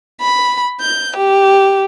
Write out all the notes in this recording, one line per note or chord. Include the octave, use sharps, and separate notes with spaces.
B5
G6
G4